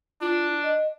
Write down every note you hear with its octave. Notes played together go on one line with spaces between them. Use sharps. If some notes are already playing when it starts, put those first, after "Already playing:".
D4 F4
D#5